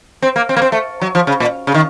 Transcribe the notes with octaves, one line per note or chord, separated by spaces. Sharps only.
C4
A#3
C4
A#3
C4
A3
F#3
F3
C#3
A#2
C#3
D#3